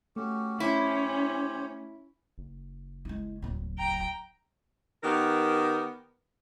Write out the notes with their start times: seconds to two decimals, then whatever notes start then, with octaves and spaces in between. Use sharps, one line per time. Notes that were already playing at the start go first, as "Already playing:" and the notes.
0.16 A3 C#4 F#4 G4
0.60 C#4 E4 G4 C5 C#5
2.38 F#1
3.05 G#3 E4
3.42 D1 F#3
3.78 G5 A#5
5.03 D#3 B3 G4 A#4